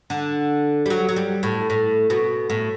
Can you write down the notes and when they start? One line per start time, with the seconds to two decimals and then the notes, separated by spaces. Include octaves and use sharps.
0.10 D3
0.86 G3
0.90 F#3
1.09 F#3
1.16 G3
1.43 A2
1.70 A2
2.10 B2
2.50 A2